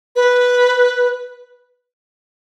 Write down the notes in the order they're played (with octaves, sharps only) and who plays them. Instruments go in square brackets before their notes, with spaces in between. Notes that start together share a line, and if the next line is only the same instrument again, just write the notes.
[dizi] B4